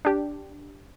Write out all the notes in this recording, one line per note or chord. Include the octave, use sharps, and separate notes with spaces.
D4 G4